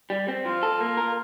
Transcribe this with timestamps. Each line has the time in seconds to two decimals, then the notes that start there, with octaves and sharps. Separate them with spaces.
0.10 G3
0.28 C4
0.45 F3 F4
0.63 A4
0.81 A#3
0.97 A#4